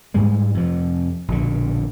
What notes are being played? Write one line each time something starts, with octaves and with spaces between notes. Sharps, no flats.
G#2 G3 G#3
F2 C3 F3
A#1 B2 D3